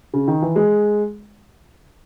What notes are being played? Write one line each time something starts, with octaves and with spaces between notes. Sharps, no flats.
C#3
D#3
E3
G#3